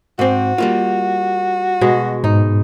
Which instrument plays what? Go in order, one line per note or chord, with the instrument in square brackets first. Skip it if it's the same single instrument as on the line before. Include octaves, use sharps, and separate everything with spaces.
[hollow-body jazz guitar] G#2 C4 [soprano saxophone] F#4
[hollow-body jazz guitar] G3 A#3 F4
[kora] B2 G#3
[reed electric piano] G#2 [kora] D#4